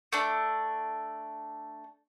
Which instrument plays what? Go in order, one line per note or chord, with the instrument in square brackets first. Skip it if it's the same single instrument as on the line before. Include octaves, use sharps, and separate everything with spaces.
[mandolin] A3 D4